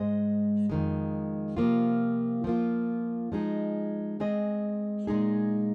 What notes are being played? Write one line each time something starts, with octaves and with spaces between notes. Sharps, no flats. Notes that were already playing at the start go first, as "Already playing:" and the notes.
Already playing: G#2 G#3 C5 D#5
F2 D#3 G#3
C3 F3 A#3 F4
F3 A#3 F4
F3 G#3 D#4 G#4
G#3 C4 G#4 D#5
A#2 G#3 D#4 G#4